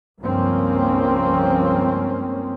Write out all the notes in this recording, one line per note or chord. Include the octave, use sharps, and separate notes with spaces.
C#2 G2 F3 A#3 C4 C#4